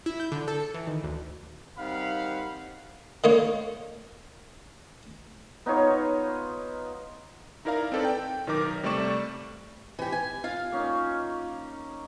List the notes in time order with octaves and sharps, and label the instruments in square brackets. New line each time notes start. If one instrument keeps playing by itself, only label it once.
[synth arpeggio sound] E4
G6
D3
A4
C#7
E3
D#3
D2
[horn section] D#3 G3 C4 F5 F#5 B5
[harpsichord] D3 A#3 D#4 C#5
[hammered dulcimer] B3 D#4 F4 C#5
[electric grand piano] D#4 E4 A#4 D5 F5 A#5
C4 D#4 A4 B4 D5
G5
B1 D#3 D#4 A#4 D6
C3 G3 A3 D5 C#6 E7
[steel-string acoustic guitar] E3 G4
G#5
F4 F5
[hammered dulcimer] A#3 C#4 D#4